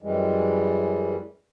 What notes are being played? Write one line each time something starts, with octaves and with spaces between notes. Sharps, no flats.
F#2 E3 G3 G#3